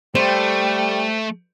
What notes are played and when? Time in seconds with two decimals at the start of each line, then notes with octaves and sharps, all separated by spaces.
0.15 G3 A3 C5 G5